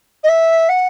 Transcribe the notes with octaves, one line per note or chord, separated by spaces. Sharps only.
D#5
E5
F#5